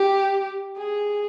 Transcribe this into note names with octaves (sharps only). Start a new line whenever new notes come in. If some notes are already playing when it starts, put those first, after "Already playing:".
Already playing: G4
G#4